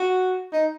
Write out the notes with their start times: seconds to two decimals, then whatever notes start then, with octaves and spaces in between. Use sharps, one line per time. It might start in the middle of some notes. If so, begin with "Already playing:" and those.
Already playing: F#4
0.53 D#4